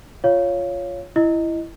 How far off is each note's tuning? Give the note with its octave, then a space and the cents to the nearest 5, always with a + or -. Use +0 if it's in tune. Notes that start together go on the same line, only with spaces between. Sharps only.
F4 +0 C#5 +5 F5 -5
E4 +10 D#5 +0